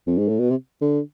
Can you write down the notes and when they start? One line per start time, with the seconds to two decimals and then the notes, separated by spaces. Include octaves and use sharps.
0.07 F2
0.18 G#2
0.28 A2
0.39 B2
0.50 C3
0.81 D3